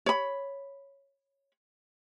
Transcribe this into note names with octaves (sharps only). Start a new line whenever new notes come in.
C#5 B5